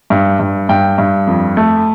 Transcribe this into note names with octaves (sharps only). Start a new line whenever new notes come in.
G2
G2
G2 G5
G2
F2
A3